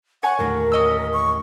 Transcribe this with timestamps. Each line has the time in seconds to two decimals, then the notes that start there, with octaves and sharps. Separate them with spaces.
0.23 C#5 F#5 G#5 C#6
0.39 D#2 A2 D3 A#4
0.72 C#4 D#5 E6
1.12 C#6